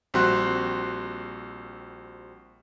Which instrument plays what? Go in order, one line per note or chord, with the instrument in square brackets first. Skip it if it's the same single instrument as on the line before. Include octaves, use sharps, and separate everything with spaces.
[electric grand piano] A#1 G3 C4 F#4 C6 F#6